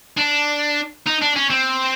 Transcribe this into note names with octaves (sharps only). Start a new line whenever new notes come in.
D4
D#4
D4
C#4
C4